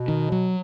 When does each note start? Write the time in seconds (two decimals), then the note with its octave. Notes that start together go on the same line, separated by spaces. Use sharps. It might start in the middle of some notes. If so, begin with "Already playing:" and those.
Already playing: B2
0.08 D#3
0.32 F#3